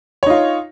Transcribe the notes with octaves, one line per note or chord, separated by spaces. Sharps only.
D#4 F4 C#5